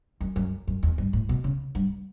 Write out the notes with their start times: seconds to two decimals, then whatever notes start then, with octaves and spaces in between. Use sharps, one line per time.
0.21 F#2
0.36 F#2
0.67 F#2
0.83 E2
0.98 G2
1.13 A2
1.29 B2
1.44 C#3
1.75 G2